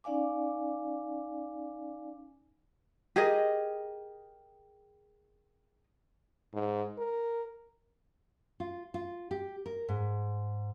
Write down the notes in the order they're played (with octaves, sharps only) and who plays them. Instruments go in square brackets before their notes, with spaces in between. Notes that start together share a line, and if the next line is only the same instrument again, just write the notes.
[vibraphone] C#4 D#4 D5 F5 G#5 D6
[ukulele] G4 G#4 A#4 D#5
[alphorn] G#2
A#4
[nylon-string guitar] F4
F4
G4
A#4
G#2